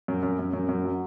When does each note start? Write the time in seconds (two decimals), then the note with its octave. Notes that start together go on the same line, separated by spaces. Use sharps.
0.08 F#2
0.23 F#2
0.39 F#2
0.53 F#2
0.69 F#2
0.85 F#3